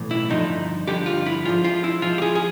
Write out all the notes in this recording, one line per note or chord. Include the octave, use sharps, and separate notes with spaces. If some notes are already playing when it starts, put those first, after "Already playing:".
Already playing: B1 A2 E3
E4
G2 D3 F3 D#4
G2 D3 F3 G4
F4
E4
G#2 F3 F4
F4
E4
G#2 F3 F4
G4
G#4
G#4